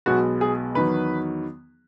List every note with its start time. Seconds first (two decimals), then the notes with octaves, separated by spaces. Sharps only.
0.06 B1 B2 G#3 B3 F#4
0.41 G#4
0.75 E2 D#3 F#3 B3 B4